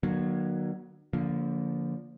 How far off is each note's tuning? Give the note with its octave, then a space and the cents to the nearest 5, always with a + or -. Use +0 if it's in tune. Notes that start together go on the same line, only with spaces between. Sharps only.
D3 +45 F#3 +0 A#3 +45
D3 -30 F3 +0 A#3 +0